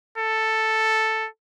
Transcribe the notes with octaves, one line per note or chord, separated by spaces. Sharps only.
A4